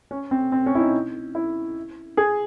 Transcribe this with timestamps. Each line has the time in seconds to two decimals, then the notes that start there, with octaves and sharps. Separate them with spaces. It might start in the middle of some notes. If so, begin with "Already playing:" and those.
0.11 C#4
0.31 C4
0.52 C4
0.66 C#4
0.75 E4
0.79 D#4
1.35 E4
2.17 G#4